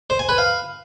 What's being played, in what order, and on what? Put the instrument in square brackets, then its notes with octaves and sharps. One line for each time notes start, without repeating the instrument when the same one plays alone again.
[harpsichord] C5
G#5
B4
F5